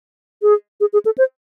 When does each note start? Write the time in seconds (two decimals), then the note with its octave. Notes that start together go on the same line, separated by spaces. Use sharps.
0.42 G#4
0.81 G#4
0.93 G#4
1.05 A4
1.18 C5